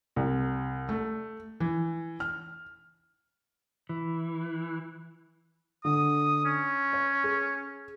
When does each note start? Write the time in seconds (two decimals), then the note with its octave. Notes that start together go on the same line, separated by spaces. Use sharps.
0.16 C2
0.89 A3
1.60 E3
2.20 F6
3.89 E3
5.85 D3 D#6
6.45 C#4
6.93 C#5
7.24 G#4